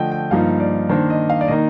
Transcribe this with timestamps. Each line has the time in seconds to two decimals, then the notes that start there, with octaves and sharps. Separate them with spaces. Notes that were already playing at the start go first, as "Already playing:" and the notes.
Already playing: D3 F3 A3 D#5 G5
0.12 G5
0.31 G2 F3 A#3 D#4 F5
0.60 D5
0.89 D#3 A#3 D4 C5
1.10 D#5
1.30 F5
1.41 D5
1.48 D#3 A#3 D#4 D#5